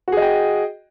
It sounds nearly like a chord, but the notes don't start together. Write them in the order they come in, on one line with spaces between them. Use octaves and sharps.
F#4 G#4 D#5 G5